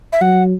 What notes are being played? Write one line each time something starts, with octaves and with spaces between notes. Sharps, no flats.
E5
F#3 F#5